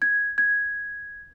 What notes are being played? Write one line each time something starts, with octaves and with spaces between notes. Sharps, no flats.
G#6
G#6